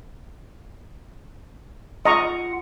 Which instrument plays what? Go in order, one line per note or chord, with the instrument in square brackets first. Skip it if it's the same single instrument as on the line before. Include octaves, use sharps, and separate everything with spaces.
[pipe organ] F4 F#5 [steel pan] D#5 A#5 C#6